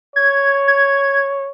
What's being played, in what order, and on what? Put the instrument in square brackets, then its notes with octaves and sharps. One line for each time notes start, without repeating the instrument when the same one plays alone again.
[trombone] C#5 [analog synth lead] G#6
[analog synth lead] G#6